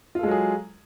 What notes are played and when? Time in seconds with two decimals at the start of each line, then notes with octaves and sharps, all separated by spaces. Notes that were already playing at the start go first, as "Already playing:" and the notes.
0.15 F4
0.19 A4
0.23 G#3
0.27 F#3
0.31 G#4